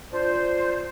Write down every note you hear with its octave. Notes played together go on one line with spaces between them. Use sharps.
D4 F4 C5